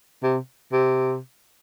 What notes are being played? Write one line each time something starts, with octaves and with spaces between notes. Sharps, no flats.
C3
C3